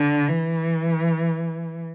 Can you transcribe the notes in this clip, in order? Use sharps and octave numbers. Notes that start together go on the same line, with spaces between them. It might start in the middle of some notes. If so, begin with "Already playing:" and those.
Already playing: D3
E3